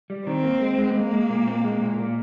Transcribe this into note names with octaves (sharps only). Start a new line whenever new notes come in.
G3
D#3 C4
A#3
G#3
G#3
G#3 A#3
G#3
A#2
C4
G#3
A#2
A#3